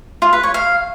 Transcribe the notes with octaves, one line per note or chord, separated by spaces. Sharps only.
F4
B4
C#5
F5